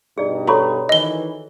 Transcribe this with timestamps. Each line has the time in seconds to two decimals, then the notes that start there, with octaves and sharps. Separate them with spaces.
0.18 G2 B2 D#4 G#4 D5
0.47 F#4 A4 C#5 A#5 B5 C#6
0.89 D#3 E3 D#5 G7